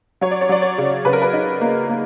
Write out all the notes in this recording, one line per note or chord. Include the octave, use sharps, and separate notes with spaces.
F#3 C#5
D5
C#5
F#3 D5
C#5
C#3
C#3 B4
A#4
B4
D#4
A#3
A#3